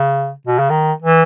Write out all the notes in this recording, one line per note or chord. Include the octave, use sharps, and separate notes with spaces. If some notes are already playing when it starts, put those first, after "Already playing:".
Already playing: C#3
B2
C#3
D#3
E3